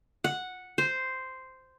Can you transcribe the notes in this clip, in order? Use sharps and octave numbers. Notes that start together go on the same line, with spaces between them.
F#5
C5